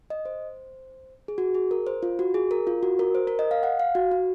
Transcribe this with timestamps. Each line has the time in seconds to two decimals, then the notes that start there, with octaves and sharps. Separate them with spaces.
0.10 D#5
0.25 C5
1.28 G#4
1.38 F#4
1.55 G#4
1.71 A#4
1.87 C5
2.03 F4
2.19 F#4
2.34 G#4
2.51 A#4
2.67 F4
2.83 F#4
2.99 A#4
3.15 C5
3.27 A#4
3.39 D#5
3.51 F5
3.63 F#5
3.79 F5
3.95 F#4
4.11 F#4